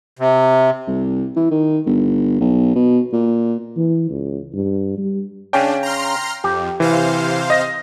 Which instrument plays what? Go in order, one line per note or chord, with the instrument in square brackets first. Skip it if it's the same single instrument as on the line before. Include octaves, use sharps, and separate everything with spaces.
[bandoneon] C3
[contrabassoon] C2
E3
D#3
G1
B1
B2
A#2
[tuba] E3
C#2
G2
G3
[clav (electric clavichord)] C#3 C#4 [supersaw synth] D4 [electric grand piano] G5
[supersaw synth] A#5 C6 F6
[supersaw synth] F2 [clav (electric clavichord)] G4
[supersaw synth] C3 C5 F5 [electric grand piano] E3
[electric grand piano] D#5 A#6